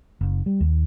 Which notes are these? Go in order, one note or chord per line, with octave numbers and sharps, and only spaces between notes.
F#1
G3
D#2